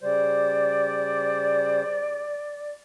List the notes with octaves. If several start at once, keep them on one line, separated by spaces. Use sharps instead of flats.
C#3 G3 C5 D5